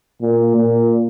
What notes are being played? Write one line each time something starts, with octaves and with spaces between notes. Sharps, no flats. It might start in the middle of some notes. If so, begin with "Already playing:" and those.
A#2
A#2